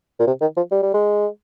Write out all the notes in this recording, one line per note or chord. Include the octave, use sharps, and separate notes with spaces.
A#2
C3
D#3
F3
G3
G3
G#3